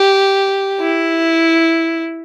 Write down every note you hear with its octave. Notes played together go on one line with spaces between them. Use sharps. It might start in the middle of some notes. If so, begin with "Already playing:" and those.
Already playing: G4
E4